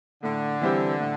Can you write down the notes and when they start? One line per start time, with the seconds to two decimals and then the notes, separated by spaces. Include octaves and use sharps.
0.23 A2 D3
0.61 E3 G3 C4 G4
1.00 A2